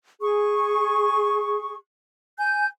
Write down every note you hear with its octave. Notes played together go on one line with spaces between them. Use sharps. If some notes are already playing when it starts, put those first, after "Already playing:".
G#4 C#6
G#5 G6